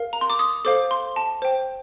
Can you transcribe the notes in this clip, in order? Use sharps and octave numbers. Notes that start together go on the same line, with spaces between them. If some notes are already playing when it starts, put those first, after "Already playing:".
Already playing: A#4 F5
A#5
C6
D6
D#6
A4 C5 F5 D6
C6
A5
C5 G5